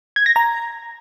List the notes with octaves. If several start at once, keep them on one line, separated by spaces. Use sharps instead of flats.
G#6
A#6
A#5